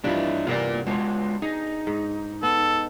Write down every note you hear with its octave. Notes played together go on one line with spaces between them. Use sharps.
G2 E3 F3 D4 E4
C3 B3 F4 A#4 D5
G#3 D4 F4 F#4 C#5
D#4 G#4
G#2
B3 A4